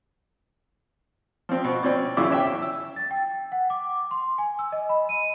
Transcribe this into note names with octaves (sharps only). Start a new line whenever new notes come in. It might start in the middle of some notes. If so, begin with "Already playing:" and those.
F3 C4
B2
C4 C#4 D5
F#2 C#3 E3 E4 F4 D6
C#4 E5 G5
E6
A6
G5
F#5
D6
C6
G#5
E6
D#5
B5
D#7